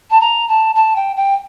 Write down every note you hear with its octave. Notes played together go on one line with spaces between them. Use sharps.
A5
A#5
A5
A5
G5
G5